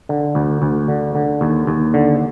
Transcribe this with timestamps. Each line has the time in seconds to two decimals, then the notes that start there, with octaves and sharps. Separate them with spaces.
0.09 D3
0.35 D2
0.62 D2
0.88 D3
1.15 D3
1.41 D#2
1.67 D#2
1.94 D3